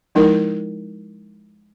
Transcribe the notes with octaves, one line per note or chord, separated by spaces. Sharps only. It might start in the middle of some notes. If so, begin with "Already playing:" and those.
F3 G#3 D#4 E4 A#4